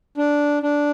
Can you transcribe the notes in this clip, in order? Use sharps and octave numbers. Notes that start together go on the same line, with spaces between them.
D4
D4